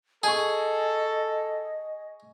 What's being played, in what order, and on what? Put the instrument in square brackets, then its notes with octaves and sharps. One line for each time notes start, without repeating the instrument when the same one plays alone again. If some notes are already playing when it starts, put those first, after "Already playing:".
[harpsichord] G#4 [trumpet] A4 [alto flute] D#5 [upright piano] G#5 C#6